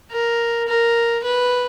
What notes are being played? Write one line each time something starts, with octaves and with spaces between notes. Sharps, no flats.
A#4
A#4
B4